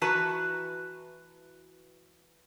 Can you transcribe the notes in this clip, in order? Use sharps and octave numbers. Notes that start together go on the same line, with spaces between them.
E3 F#4 B4 A5 A#5